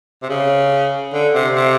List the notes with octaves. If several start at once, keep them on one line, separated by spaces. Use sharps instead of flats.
C3
C#3
D3
C3
C3